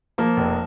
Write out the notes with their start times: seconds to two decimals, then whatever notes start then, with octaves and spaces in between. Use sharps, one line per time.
0.18 F3 A#3
0.37 F1